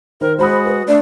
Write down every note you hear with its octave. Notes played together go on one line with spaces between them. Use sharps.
D#3 A#4 C5
G#3 F#4 C5 B5 D#6
B4
A3 D4 D5